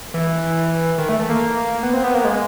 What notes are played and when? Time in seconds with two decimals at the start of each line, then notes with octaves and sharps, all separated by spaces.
0.14 E3
0.98 D#3
1.09 A3
1.19 A3
1.30 A#3
1.83 B3
1.93 C4
2.04 B3
2.14 A#3
2.25 G#3